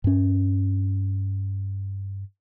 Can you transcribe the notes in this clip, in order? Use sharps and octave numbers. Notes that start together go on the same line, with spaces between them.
G2 C#4